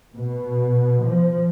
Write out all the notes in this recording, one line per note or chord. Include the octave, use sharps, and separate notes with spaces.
B2
F3